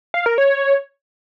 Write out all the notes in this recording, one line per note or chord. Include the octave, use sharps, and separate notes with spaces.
F5
A#4
C#5